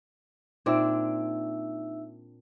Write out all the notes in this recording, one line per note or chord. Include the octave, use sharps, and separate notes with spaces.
A#2 C4 D4 D#4 E5 E6